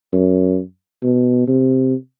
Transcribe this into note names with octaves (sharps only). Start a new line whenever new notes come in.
F#2
B2
C3